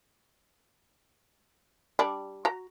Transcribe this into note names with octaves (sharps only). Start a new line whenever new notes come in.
G3 D4
F#4 A#5